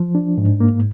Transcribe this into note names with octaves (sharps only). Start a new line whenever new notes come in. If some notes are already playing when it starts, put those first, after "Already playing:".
Already playing: F3
D4
G#2
A#3